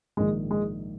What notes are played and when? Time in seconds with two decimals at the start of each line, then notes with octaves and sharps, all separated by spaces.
0.17 A#1 G#2 D#3 G#3
0.51 G#3